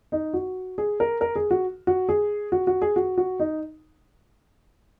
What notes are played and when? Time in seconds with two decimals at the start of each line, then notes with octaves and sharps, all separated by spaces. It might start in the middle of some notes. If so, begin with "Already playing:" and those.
0.12 D#4
0.34 F#4
0.78 G#4
1.00 A#4
1.21 A#4
1.36 G#4
1.51 F#4
1.87 F#4
2.09 G#4
2.52 F#4
2.67 F#4
2.82 G#4
2.96 F#4
3.18 F#4
3.40 D#4